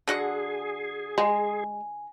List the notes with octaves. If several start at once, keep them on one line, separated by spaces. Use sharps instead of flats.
D3 F#4 G#4 F#5
G#3 G#5